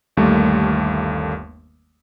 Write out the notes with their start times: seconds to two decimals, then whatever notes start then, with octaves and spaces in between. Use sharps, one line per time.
0.17 G1 D#2 G3 A3 A#3